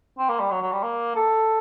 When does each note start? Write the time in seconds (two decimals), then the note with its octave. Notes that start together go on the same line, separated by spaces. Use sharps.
0.19 C4
0.29 A#3
0.40 G3
0.51 F#3
0.62 F#3
0.72 G3
0.83 A#3
1.16 A4